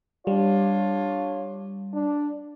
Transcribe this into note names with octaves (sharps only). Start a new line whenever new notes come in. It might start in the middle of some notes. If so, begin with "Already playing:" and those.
G3 D4 F4 C#5
D4